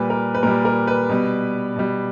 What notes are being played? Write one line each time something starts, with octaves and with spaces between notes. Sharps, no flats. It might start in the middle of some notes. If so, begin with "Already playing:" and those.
Already playing: A#2 G3 B4
A#4
B4
A#2 G3 A#4
A#4
B4
B2 G3
B2 G3